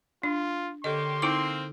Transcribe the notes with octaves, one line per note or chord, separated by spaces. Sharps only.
D4 F4
D3 A#3 C#4 G4 A4 D#5 C6
A#3 C4 D#4 E4 D6